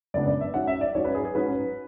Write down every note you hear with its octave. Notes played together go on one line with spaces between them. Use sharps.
F#2 C#3 G#3 B3 D4 D5
D5
E5
G#2 F#3 C#4 F#5
E5
D5
G#2 F#3 C#4 C#5
B4
G#4
G#4
G#2 F#3 C#4 B4